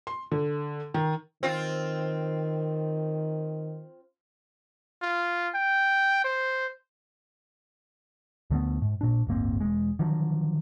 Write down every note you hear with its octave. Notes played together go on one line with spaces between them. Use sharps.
C6
D3
D#3
D#3 C4 F4
F4
G5
C5
D2 D3 A3 B3
G#2
A#2 D4
D1 G1 A#3 C4
E1 G#3
D3 D#3 F3 F#3